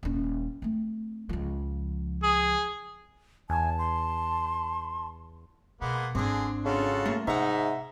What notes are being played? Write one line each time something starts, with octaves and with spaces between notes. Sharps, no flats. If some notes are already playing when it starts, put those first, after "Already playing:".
D#1 C#4
A3 C4
C#2 F3
G#4
E2 G#5 A5
C6
B2 G#3 A#3 B3
G#1 G#2 D3 C4 D4 G#4
C#3 F4 F#4 A4
A3 A#3
G#2 C3 D#4 E5 F#5